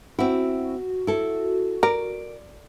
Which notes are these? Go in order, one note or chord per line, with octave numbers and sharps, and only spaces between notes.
C4 E4 F#4
E4 A4
A#4 D5